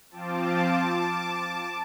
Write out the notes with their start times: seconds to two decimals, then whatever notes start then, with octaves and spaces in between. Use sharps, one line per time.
0.10 F3 C4 F4 A5 D6